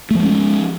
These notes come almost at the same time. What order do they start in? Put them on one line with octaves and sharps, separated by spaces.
A3 F3 G#3 C#4